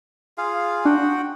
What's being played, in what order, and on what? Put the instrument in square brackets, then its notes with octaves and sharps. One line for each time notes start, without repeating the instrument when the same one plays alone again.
[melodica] F4 G#4 F5
[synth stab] D4 [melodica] F#4 F#5 G5